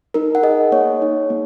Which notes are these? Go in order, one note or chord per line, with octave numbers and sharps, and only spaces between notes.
D#4 A#4
F#5
G#4 D#5
A#3 C#5
D#4
A#3